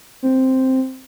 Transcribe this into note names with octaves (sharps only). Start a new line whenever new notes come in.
C4